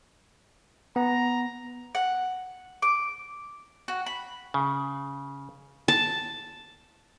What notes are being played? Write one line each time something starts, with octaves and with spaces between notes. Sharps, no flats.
B3 A#5
F#5
D6
F#4
B5
C#3
A5